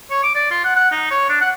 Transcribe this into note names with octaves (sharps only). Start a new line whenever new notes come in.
C#5
D6
D5
F4
F#5
F#5
D#4
C#5
D4
F#5